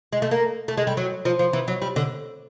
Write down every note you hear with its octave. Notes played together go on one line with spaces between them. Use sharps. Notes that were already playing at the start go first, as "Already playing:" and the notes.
G#3
A3
A#3
A3
G#3
G3
F#3
F3
F3
E3
F#3
G3
D3